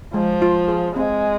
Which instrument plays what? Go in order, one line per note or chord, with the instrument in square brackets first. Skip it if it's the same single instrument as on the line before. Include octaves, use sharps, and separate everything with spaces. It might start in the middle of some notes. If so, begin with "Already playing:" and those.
[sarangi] F3 [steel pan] G#3
[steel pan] F4
G#4
[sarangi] G#3 [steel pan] C4